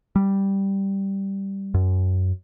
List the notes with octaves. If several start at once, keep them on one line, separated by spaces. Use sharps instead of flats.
G3
F#2